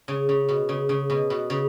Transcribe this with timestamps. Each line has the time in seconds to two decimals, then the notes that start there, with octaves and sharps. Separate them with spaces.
0.08 C#3
0.29 C#3
0.49 B2
0.69 C#3
0.89 C#3
1.10 B2
1.30 B2
1.50 C#3